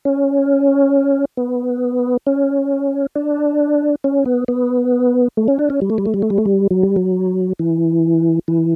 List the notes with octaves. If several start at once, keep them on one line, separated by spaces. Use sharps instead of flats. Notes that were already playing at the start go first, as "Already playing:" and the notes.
C#4
B3
C#4
D4
C#4
B3
B3
A3
C#4
D4
C#4
G3
A3
G3
A3
G3
A3
G3
A3
G3
F#3
G3
F#3
E3
E3